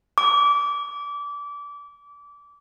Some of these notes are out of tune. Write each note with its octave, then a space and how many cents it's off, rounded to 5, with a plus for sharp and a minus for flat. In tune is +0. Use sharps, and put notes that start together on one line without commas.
D6 -25